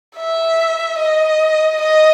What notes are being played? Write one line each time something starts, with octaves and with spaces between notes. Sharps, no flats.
E5
D#5
D#5